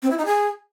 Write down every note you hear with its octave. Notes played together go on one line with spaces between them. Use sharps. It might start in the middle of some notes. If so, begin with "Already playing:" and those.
C4
E4
D#4
G#4